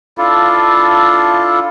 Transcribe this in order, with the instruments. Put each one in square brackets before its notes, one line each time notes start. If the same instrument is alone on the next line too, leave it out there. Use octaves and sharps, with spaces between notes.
[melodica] D4 E4 F4 A4